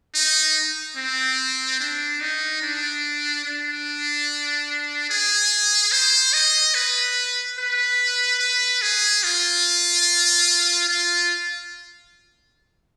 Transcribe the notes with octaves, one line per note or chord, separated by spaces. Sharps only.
D#4
C4
D4
D#4
D4
D4
G#4
C5
D#5
B4
B4
B4
G#4
F4
F4